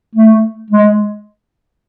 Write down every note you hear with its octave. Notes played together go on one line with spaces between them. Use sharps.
A3
G#3